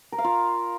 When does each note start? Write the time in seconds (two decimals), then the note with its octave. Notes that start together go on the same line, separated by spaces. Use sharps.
0.12 A#4
0.18 F5
0.24 F4